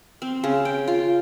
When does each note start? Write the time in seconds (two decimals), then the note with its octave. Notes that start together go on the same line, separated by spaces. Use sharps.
0.22 C4
0.44 C#3
0.65 G5
0.88 F4